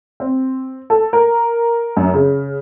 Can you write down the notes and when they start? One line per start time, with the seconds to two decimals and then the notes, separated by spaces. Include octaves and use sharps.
0.20 C4
0.90 A4
1.13 A#4
1.97 F#2
2.14 C#3